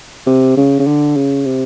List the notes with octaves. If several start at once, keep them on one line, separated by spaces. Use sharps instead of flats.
C3
C#3
C#3
D3
C#3
C3